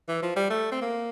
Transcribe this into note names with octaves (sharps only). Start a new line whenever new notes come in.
E3
F3
G3
A3
C4
A#3